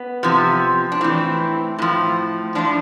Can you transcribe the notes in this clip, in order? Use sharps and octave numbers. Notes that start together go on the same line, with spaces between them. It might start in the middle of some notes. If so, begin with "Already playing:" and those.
Already playing: B3
C3 F3
D4
A2 E3 C4
A2 F3
A2 F3 D4